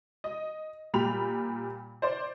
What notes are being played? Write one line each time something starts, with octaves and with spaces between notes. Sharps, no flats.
D#5
A#2 G3 G4 B5 F7
C5 D5 C6